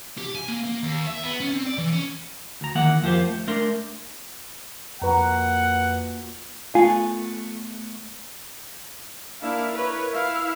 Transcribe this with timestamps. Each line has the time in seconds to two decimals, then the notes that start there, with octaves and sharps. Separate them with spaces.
0.18 G4
0.35 G#5
0.48 A#3
0.64 A#3
0.82 D#2
1.06 E5
1.23 B3
1.40 C#4
1.52 C4
1.66 D5
1.78 E3
1.92 C#4
2.61 D2 A#5
2.75 E2 D#3 A#3 E5 F#5
3.03 F2 F3 A#3 G4 C5
3.27 A3
3.47 A3 D4 A#4 C6
5.01 F2 A#2 F#4 B4 F#5 A#5
6.75 A3 B3 F4 G#5
9.41 A#3 D4 E4 E5 F5
9.73 E4 A#4 B4 C#5
10.12 E4 E5 F5